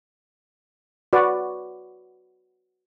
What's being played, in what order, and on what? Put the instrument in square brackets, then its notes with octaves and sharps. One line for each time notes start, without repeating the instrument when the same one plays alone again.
[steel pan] F#4 B4 D5